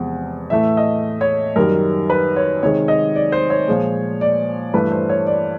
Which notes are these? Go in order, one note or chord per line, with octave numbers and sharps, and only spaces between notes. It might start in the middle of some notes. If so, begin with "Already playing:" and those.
Already playing: E2 C3 F3 G#3
A2 E3 A3 E5
D#5
C#5
F#2 D#3 G3 A#4
B4
C#5
C3 D#3 G#3 C#5
D#5
D5
C5
C#5
A#2 F3 G#3
D5
G2 E3 A3 B4
C5
C#5
D5